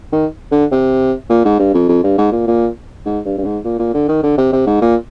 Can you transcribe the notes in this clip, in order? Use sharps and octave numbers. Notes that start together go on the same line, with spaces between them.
D#3
D3
C3
A#2
G#2
G2
F2
F2
G2
G#2
A#2
A#2
G#2
G2
G2
G#2
A#2
A#2
D3
D#3
D3
C3
C3
G#2
A#2